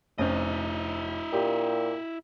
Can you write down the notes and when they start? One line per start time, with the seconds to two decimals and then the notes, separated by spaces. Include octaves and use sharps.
0.18 F1 C4 C#4 E4 D#5
1.33 A#2 G4